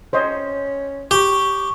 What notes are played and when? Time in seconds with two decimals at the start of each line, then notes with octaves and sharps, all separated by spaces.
0.13 C#4 C5 C#5 D#5
1.11 G4 C#6